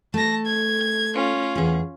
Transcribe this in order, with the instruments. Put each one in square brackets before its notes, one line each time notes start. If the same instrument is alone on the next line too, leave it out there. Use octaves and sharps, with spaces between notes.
[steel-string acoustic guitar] A3 [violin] A5 A#6
[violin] G#6
C#4 F4
[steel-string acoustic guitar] E2 G#4